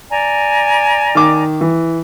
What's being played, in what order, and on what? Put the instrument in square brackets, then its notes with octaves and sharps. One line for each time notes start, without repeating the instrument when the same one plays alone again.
[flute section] D5 G#5 A#5
[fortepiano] D#3 D6
E3